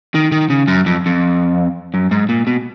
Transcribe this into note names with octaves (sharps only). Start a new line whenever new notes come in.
D#3
D#3
C#3
F#2
F2
F2
F#2
G#2
A#2
B2